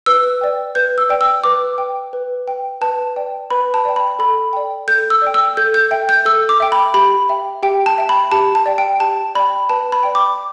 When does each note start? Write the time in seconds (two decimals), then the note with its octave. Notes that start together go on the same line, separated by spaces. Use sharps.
0.06 B4 E6
0.41 D5 G5
0.75 B4 G6
0.98 E6
1.09 D5 G5
1.21 E6
1.44 B4 D6
1.78 G5
2.13 B4
2.48 G5
2.81 B4 A5
3.16 D5 G5
3.50 B4 B5
3.74 A5
3.85 D5 G5
3.96 B5
4.19 A4 B5
4.53 D5 G5
4.88 A4 G6
5.10 E6
5.22 D5 G5
5.34 E6
5.57 A4 G6
5.74 G6
5.91 E5 G5
6.09 G6
6.25 A4 E6
6.49 D6
6.60 E5 G5
6.72 B5
6.94 G4 B5
7.29 E5 G5
7.63 G4 G5
7.86 A5
7.98 E5 G5
8.09 B5
8.31 G4 A5
8.55 A5
8.66 D5 G5
8.78 G5
9.00 G4 A5
9.35 D5 G5 B5
9.69 B4 A5
9.92 B5
10.03 D5 G5
10.15 D6